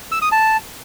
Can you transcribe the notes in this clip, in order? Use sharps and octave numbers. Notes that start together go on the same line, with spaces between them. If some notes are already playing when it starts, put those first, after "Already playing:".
E6
D#6
A5